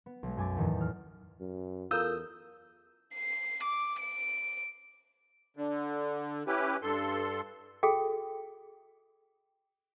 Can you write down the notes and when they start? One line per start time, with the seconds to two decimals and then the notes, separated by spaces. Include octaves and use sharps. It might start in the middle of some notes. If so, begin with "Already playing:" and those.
0.06 B3
0.23 B1 G#3
0.37 F#2 G#5 D6 A6
0.57 E2 A2 D#3 E3 D#4
0.79 E3 F6
1.40 F#2
1.91 E2 F4 A4 A#4 D#6 E6 G6
3.14 C7
3.64 D6
3.99 D7
5.57 D3
6.47 C#4 E4 G4 B4
6.82 G2 A4 C6
7.83 F#4 G#4 A4 G5